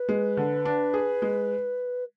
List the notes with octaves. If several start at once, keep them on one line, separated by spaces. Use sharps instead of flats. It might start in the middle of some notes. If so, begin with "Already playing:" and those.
Already playing: B4
G#3
D3
D4
G#4
G#3